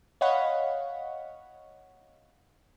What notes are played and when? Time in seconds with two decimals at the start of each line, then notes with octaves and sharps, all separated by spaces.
0.21 C#5 D#5 F5 F#5 B5